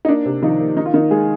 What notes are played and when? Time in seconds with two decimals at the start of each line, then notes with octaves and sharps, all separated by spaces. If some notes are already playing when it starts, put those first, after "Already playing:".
0.05 D#4
0.09 A#3 D4
0.26 C3
0.43 D#3 F3 D#4
0.60 A#3
0.77 D#3 D#4
0.86 F4
0.94 D#3 A#3 D#4
1.11 G#3 G#4